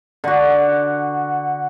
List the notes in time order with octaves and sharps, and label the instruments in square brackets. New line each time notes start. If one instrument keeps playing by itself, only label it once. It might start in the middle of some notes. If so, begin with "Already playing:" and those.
[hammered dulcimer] D3 F#4